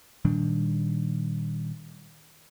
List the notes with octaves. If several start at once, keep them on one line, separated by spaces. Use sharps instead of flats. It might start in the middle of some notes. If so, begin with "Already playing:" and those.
A#2 D#3 G3 D4